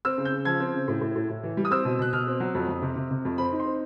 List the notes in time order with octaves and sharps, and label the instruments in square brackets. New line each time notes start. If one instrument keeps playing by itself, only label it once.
[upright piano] C4 E6
C#3
G6
C#3
F3 G#6
C4
C#3
A2
A2
A2
A2
E3
G3
D#6
C4 E6
B2
B2 F#6
B2 F6
C4
F#3
F2
F2
C3
C3
C3
F2
C4 B5
D#4
C6
C4